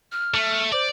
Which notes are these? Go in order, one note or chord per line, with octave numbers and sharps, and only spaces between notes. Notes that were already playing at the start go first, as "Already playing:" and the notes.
F6
A3
C5 D5